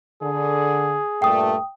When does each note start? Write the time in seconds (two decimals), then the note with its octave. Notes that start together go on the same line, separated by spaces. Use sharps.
0.22 D3 G#4
1.22 G2 A#2 A3 G5 D#6